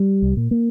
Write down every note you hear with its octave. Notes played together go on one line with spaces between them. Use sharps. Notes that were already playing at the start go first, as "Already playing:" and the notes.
Already playing: G3
C2
A#2
A#3